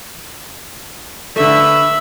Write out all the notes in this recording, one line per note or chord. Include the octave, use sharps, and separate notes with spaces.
D3 A3 B4 E5